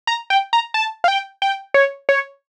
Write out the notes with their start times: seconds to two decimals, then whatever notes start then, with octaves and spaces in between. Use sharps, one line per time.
0.07 A#5
0.30 G5
0.53 A#5
0.74 A5
1.04 F5
1.08 G5
1.42 G5
1.74 C#5
2.09 C#5